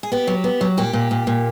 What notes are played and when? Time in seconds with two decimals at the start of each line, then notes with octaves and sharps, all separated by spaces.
0.03 G#4
0.12 B3 G4
0.27 F#3
0.44 B3
0.61 F#3
0.77 A#2 G4
0.93 A#2
1.11 A#2
1.27 A#2